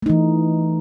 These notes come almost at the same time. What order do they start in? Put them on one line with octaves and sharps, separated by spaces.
A3 D#4 E3